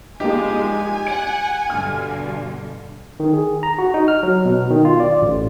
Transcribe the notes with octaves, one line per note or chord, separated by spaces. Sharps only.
F3 G3 G#3 A#3 D#4 G4 G#5
F#5 D7
G2 B2 D3 F6
D#3
G#4
A#5
F#4
D#4
F6
F#3
B2
D#3
F4
D5
A1